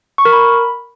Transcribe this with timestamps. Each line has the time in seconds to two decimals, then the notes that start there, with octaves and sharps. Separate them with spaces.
0.18 C#6
0.25 A#4
0.33 B5